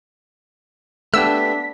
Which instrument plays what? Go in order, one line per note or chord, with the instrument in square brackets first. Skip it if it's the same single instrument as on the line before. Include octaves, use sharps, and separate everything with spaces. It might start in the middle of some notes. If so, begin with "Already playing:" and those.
[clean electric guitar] A3 B3 G4 [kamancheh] D4 [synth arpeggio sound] E6 [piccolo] B6